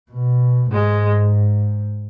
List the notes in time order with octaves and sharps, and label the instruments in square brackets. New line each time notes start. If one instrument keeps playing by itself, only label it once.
[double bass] B2
[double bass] G#2 [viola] G#3